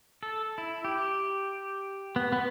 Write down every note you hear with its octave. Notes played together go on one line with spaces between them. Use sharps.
A4
E4
G4
B3
B3